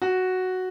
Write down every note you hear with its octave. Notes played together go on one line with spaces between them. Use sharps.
F#4